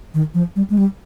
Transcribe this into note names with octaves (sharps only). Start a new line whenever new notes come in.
D#3
F3
G3
G#3
G3